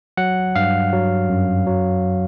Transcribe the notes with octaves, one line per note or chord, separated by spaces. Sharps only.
F#3 F#5
G2 F5
F#3
F#2
F#3